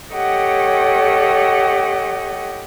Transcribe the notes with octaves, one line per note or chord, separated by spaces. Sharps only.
G4 A4 C#5 D#5 F#5 G5